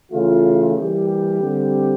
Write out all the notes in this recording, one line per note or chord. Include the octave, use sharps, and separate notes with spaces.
C#3 E3 A3 F4
E3 G3 A#3 G4
G4
D3 G3 C4